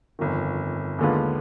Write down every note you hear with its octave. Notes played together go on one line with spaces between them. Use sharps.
G1 F2 D#3
D#2 D3 G#3 B3 F4